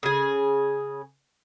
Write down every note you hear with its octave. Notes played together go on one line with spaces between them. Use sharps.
C#3 G#4